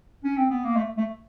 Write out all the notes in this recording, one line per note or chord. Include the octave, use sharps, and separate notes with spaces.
C#4
C4
B3
A#3
A3
A3